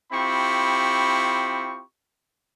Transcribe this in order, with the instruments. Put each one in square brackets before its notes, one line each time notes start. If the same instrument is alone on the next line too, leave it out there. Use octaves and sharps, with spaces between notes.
[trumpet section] C4 E4 F4 G4 B5 C#6